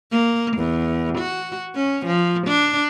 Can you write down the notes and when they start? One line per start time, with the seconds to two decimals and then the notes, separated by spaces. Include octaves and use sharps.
0.11 A#3
0.57 E2
1.18 F#4
1.75 C#4
2.06 F3
2.47 D4